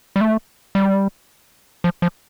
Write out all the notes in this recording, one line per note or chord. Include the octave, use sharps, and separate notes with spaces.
G3
A3
G3
F3
F3